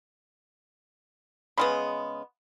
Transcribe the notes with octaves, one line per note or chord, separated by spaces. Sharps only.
C#3 G#3 B3 B5 C6